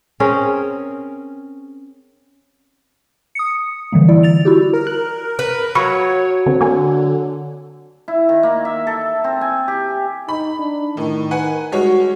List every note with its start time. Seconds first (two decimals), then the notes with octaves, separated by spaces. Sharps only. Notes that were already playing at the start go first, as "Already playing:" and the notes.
0.20 C4 C#4 G#4 A#4
3.35 D#6 C#7
3.92 D3 E3 G3 A#3
4.08 E4 D5
4.23 A6 F7
4.45 E4 F#4 G4
4.73 A#4
4.87 F#6
5.39 B4
5.75 F#3 C#5 F5 B5 C#6
6.46 D3 C4
6.61 D3 A#3 G#5
8.08 E4
8.29 D#3
8.43 A#3
8.65 E5
8.87 A4
9.24 C4
9.41 G#5
9.68 G4
10.29 D#4 B5
10.59 D4
10.97 A2 D#3
11.31 B4 F#5 G#5
11.72 G3 G#3 F#4 C#5